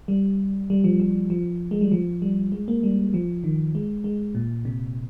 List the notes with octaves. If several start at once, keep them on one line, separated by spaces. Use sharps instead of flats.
G3
G3
F3
F3
F3
G#3
G3
F3
G3
G#3
A#3
G3
F3
D#3
G#3
G#3
A#2
C3